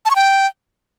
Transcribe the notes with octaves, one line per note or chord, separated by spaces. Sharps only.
A5
C#6
G5